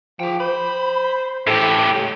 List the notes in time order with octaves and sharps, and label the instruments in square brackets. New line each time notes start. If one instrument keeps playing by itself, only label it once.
[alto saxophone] F3 [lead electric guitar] G#4 G5
[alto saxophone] C5 [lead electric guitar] B5
[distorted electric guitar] A2 G4 [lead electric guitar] E4 B4 [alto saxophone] A4
[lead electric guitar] G#3 C#5 [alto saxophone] G4